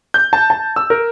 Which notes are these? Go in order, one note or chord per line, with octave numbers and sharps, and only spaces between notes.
G6
A5
A5
E6
A#4